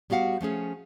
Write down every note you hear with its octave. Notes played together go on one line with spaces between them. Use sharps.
G3 B3 F#4 F5 F#5
F3 A3 C#4 G#4